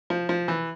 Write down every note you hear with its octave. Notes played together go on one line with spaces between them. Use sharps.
F3
F3
E3